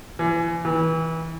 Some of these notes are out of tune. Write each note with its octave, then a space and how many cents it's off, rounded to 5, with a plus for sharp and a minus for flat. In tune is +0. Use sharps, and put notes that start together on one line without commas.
E3 +35
E3 -25